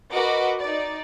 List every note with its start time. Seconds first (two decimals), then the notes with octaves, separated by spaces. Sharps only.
0.14 F#4 A#4 B4 D#5 F#5 D6
0.60 D#4 D5